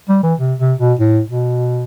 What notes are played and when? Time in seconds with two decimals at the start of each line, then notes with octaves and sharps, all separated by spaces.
0.09 G3
0.23 E3
0.39 C3
0.60 C3
0.80 B2
0.99 A2
1.30 B2